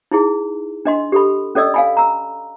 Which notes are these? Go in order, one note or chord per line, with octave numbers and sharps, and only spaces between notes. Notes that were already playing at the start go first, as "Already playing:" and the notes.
D#4 E4 G#4
D4 D#5 C6
G4 A4 B5
C#4 A4 D5 D#5 E6
F5 G#5 B5
A#5 E6